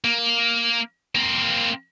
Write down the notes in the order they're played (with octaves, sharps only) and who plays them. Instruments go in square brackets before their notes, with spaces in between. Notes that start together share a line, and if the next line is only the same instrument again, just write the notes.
[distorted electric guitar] A#3
A#3 C4